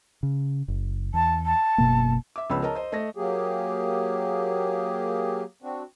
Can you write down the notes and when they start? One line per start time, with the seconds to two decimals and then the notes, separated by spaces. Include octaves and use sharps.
0.23 C#3
0.68 F#1
1.14 E2 A5
1.45 A5
1.78 F#1 B2 A#3
2.36 E5 D6
2.50 C#2 F3 B3 C#5 B5 E6
2.62 A#4 C#5 D#5 A5 A#5
2.75 C5 D#5
2.92 A3 D#5 A#6
3.15 F#3 A#3 G4 G#4
5.62 C4 D4 F#4